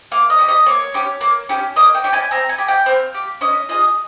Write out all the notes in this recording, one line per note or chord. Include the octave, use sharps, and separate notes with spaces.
A#3 F5
D#5
C#4 G4
D#5
A#3 C#5
C#4 G4
A#3
C#4 G4
A#3 D#5
G5
C#4 G4
G#5
C4 A#5
G#5
G4
G5
C4 F5
G4
C#4 D#5
F4 G#4 D#5